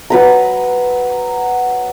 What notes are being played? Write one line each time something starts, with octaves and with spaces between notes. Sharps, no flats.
F#3 B4 A#5